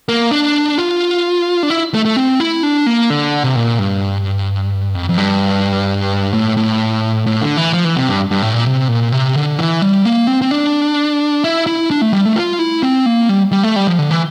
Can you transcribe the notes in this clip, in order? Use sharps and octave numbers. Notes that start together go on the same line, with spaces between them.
A#3
D4
F4
D4
E4
A3
A3
C4
E4
D4
A#3
D3
C3
A#2
G2
F2
F2
G2
A2
A2
A2
D3
E3
F3
E3
C3
G2
G2
A2
A#2
C3
A#2
C3
D3
E3
G3
A#3
C4
C4
D4
E4
E4
D4
A3
G3
A3
F4
E4
C4
A#3
G3
G3
A3
G3
F3
D3
E3